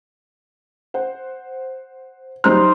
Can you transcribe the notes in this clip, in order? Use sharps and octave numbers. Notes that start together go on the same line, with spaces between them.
C5 F#5
F#3 G3 D#4 C5 F6